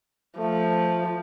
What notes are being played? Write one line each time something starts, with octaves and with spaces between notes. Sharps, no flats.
F3 A3